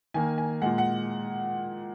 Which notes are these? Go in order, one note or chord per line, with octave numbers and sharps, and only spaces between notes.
D#3 A#3 G#5
G#5
A#2 G#3 F#5
F#5